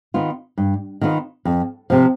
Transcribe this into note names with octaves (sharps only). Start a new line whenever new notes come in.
D#3 B3 F4
G2
D#3 B3 F4
F2
C3 F3